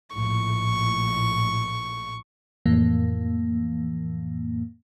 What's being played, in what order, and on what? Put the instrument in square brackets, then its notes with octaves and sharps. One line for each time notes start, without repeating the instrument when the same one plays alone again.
[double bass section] A#1 A2 [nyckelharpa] C#6
[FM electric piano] F2 A2 E3 A#3